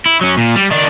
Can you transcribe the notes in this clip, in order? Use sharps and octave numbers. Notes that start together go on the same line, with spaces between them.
E4
F#3 C#4
A#2
G3
D#3 D4